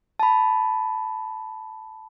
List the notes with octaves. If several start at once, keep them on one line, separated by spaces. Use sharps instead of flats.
A5 B5